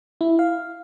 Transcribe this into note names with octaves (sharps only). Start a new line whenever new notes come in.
E4
F5